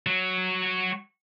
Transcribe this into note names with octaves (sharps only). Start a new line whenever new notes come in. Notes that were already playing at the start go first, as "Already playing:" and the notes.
F#3 F#4